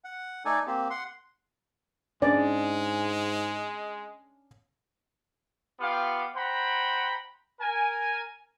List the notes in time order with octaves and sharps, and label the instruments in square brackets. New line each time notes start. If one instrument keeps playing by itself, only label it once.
[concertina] F#5
A3 D#4 A4 D5 G#5
A#3 C4 G4
F#5 C6
[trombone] G#2 [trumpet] G#3 [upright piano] C#4 D4 [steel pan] D5
[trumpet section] B3 F4 G4 F5 G5
C5 F#5 G5 A#5 B5
A#4 G#5